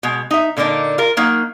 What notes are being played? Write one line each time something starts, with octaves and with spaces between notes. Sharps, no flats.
B2 G#3
D#4 E5
A#2 D3 A#3 D4 D#4
F4 A#4
F#3 A#3 D#4